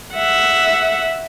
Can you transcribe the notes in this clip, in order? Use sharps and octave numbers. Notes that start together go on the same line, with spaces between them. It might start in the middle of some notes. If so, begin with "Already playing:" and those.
E5 F#5